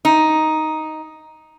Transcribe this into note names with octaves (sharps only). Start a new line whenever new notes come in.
D#4